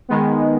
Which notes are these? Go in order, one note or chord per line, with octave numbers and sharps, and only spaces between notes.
D#3 G#3 B3